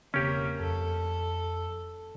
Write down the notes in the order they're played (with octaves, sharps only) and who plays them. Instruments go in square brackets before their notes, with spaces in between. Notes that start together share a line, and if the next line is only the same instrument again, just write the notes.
[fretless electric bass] E1 C#3 C4 [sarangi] A#3 [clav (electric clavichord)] C#4 G4
[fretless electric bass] F2 [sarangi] A4